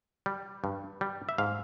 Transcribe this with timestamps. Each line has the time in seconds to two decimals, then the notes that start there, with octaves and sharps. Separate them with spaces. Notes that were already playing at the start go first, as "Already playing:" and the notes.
0.26 G3
0.64 G2
1.01 G3
1.29 E5
1.38 G#2 F5